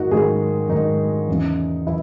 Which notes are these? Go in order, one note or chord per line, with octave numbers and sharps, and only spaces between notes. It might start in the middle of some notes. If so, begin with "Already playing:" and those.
Already playing: G#2 D#3 D#4 F#4
G#2 D#3 G#4
G#2 D#3 D#4
E2 C#3 E3
E3 E4